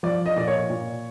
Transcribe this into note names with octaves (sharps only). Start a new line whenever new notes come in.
F3 D5
D#5
A#2 D5
C#5
A#2